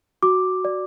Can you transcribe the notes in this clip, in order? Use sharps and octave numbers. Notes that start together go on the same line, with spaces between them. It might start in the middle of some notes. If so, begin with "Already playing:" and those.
F#4 D6
D5